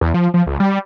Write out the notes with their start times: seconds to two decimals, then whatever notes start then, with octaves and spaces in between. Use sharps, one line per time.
0.01 E2
0.14 F3
0.34 F3
0.47 C#2
0.60 G3